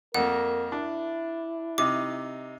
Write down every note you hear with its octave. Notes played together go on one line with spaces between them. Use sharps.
F2 A#3 A#4 F#5
D4 E4
C3 D#4 D6